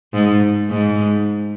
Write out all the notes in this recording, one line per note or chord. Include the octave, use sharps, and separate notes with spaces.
G#2
G#2